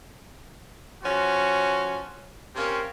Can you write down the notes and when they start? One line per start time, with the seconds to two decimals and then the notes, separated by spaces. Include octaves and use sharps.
1.04 F3 C#4 F#4
2.55 C3 A#3 C4 C#4